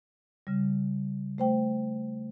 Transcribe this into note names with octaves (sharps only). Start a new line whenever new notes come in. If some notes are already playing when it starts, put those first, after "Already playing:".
C#3 G3
A3 C5 G5